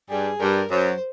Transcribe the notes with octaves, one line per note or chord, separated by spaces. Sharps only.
G2 G3 G#4
G2 G3 A#4
F#2 F#3 C5